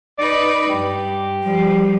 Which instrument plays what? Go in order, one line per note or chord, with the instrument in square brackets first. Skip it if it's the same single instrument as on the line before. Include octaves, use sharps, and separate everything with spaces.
[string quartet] D#4 B4 [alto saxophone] D5
[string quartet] G2 [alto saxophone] G4
[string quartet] F3 [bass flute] G3